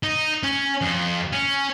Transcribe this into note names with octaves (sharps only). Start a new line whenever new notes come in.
D#4
C#4
F2
C#4